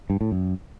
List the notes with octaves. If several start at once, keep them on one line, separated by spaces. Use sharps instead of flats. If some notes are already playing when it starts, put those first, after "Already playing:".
G2
A2
F#2